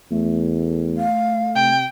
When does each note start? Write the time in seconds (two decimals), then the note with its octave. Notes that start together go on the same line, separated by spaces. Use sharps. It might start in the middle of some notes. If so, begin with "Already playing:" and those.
0.11 E2 A3
0.97 F5
1.56 C3 G5